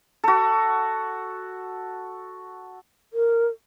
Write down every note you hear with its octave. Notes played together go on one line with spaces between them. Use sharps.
F#4 A4
A#4